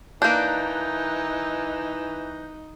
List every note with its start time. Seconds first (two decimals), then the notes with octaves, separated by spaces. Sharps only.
0.22 E3 A#3 D4 D#4 F#6 G6